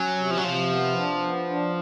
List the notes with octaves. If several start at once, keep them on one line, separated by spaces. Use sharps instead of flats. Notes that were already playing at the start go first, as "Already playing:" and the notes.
Already playing: F#3 C#4
C3
F3
F#3
C3 F3
B3
D4
B3
D4